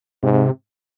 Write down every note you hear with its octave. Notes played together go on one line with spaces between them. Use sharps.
G#2 C3